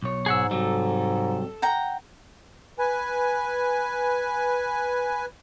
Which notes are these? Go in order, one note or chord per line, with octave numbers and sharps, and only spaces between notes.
B1 C#5
G#2 G#4 F#5 E6
C3 F#3 G3 A4
F#5 G5 A#5
B4 G#5